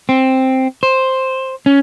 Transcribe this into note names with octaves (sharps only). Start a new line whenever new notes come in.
C4
C5
C#4